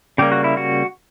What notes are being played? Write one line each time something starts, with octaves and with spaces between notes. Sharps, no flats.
C#3 G3 A#3 G4
F#4
E4
F#4